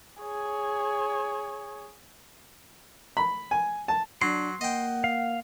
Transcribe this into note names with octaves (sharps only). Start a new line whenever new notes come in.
G#4 C#5
B5
G#5
A5
F#3 D4 C6
A#3 D#5 F#5 G5
F5